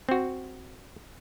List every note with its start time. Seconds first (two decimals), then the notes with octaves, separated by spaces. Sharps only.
0.09 C4 F#4